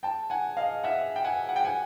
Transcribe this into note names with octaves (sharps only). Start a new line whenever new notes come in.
G5 A5
F#5 G#5
D#5 F5
E5 F#5
G5
F#5 G#5
F#5
G5
F#5 G#5